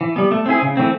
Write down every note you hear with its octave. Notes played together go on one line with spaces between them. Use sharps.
E3
G3 B3
A3
C4 E4 G#4
C#3
E3 A3 C4